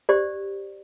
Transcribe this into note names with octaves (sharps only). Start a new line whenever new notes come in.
G4 C5 D5